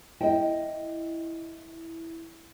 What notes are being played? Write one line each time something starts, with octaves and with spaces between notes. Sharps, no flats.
E4 D#5 G5